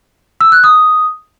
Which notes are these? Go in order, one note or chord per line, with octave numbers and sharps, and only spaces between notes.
E6
F#6
D#6